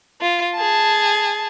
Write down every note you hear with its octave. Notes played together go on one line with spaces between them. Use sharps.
F4
G#4 A5